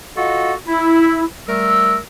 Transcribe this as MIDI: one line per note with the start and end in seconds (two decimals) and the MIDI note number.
0.17 0.54 65
0.17 0.54 66
0.17 0.54 69
0.17 0.54 75
0.17 0.54 78
0.68 1.25 64
1.49 2.00 55
1.49 2.00 57
1.49 2.00 70
1.49 2.00 88